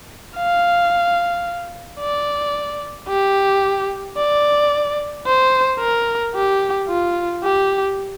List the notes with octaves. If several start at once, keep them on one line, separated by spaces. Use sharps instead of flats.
F5
D5
G4
D5
C5
A#4
G4
F4
G4